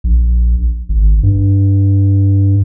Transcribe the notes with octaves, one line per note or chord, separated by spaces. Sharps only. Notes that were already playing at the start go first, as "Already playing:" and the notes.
A#1
G#1
G2